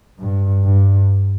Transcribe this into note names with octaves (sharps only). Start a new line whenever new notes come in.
G2
G2